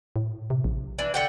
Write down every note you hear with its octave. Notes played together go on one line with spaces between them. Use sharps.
A2
C3
A#1
E3 D4
D3 F#5 G5